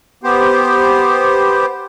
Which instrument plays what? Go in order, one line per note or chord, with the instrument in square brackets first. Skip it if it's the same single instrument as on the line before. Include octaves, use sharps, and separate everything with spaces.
[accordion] B3 G4 C5